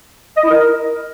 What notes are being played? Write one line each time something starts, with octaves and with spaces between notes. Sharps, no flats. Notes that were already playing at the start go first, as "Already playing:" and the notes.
D#5
E4
A#4